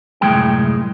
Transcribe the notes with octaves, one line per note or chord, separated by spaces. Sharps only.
C2 F#2 A2 E3 G#3 G5